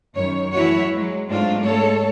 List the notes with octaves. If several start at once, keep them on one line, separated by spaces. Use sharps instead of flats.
F#2 D#3 C#5
E3 F#3 A3 E4 F#4 C#5
F#3 G#3
G#2 A3 C4 D4 F4
G#3 A3 A4 C#5